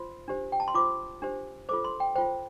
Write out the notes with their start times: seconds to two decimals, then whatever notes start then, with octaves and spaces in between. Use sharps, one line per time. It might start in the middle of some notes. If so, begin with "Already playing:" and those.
Already playing: F4 C5 C6
0.28 D4 G4 C5
0.52 G5
0.60 A5
0.68 C6
0.75 F4 C5 D6
1.22 D4 G4 C5
1.69 F4 A4 C5 D6
1.84 C6
2.00 G5
2.16 F4 C5 G5